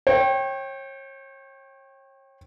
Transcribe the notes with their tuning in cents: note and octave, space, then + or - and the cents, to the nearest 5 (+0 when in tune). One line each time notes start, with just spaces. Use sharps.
C#5 -35 G5 +0